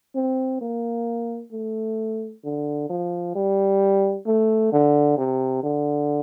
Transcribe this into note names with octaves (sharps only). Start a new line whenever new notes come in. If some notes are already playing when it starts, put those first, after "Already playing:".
C4
A#3
A3
D3
F3
G3
A3
D3
C3
D3